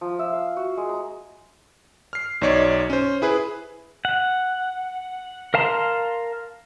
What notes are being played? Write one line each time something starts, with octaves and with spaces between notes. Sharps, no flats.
F3
E5
F5
F#4
G#3
A#5
F6 C7
B1 D#4 C#5 D5
C#4 C5
E4 G#4 B4
F#5
A#4 F5 A5 A#5 C6